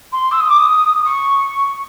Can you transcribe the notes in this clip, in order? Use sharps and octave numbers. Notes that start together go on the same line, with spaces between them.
C6
E6
D#6
D6
D#6
C#6